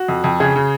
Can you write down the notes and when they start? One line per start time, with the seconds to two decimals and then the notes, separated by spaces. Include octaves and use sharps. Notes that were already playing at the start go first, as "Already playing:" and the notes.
Already playing: F#4
0.08 F2
0.24 F2
0.40 C#3 G#4
0.56 C#3